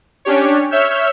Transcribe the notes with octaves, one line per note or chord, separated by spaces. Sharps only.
C#4 D4 G4 C#5
C#5 E5 E6 F6 G6